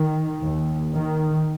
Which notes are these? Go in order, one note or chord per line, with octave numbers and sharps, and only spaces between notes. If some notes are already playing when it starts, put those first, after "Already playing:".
Already playing: D#3
D#2
D#3